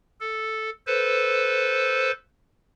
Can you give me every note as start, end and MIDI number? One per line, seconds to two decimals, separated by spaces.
0.21 0.70 69
0.87 2.12 69
0.87 2.12 71
0.87 2.12 72